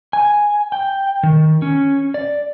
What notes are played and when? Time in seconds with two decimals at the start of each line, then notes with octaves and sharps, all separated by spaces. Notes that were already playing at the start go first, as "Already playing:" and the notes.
0.13 G#5
0.72 G5
1.23 D#3
1.62 C#4
2.14 D5